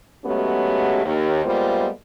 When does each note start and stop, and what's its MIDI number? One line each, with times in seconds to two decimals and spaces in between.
0.25 1.02 54
0.25 1.02 56
0.25 1.02 57
0.25 1.02 59
0.25 1.02 61
0.25 1.02 67
1.05 1.42 39
1.44 1.88 55
1.44 1.88 56
1.44 1.88 58
1.44 1.88 59
1.44 1.88 65
1.44 1.88 72